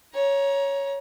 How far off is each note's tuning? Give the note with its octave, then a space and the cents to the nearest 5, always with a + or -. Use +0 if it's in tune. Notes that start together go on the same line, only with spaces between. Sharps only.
C#5 +0 A#5 +25